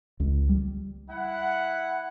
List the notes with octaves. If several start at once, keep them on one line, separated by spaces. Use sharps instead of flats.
C#2
G3
E4 F#5